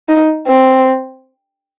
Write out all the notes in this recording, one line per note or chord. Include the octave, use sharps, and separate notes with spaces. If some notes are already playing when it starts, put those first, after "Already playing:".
D#4
C4